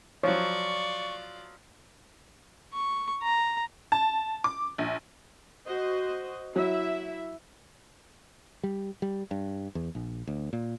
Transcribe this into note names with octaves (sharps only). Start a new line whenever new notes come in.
F3 F#3 F4 C#5 D5 C#6
C#6
A#5
A5
D6
A#1
F#4 C5 D#5
F#3 E4 E5
G3
G3
G2
E2
A#1
D2
A#2